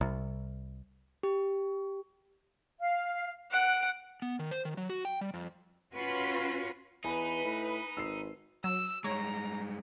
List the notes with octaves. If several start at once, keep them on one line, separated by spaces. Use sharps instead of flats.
C2
G4
F5
F#5 F#6 D7
B3
D#3
C5
D#3
F#3
F#4
G5
G3
F2
C#4 F4 F#4 B4
E2 D#4 B4 G#5 B5
A2
G#1 E6 C7
F#3 E6
G2 G#3 C#5 A#5